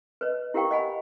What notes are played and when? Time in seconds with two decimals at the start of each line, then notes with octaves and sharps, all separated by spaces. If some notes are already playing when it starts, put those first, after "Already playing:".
0.21 B4 C#5 D#5
0.54 E4 G4 A#4 F5 G5 C#6
0.71 D#5 F#5 G#5 B5